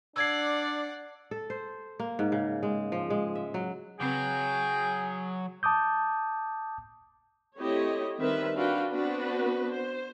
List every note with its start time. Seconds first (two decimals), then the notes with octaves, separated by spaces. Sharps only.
0.16 D4 D5 F#5 E6 G#6 C7
1.31 A4
1.50 C5
1.99 A#3
2.19 G#2
2.32 C#3
2.63 G#3
2.92 F3
3.10 G#3
3.35 E5
3.54 F#3
4.00 C#3 F#3 C4 F#4 G#4 B4 G5
5.63 A5 D6 D#6 G6
7.59 A3 C4 E4 G4 C#5 D#5
8.20 D#3 G3 C4 B4 E5
8.55 D4 F4 F#4 B4 F5 G5
8.90 B3 C4 D4 F#4 B4
9.70 C5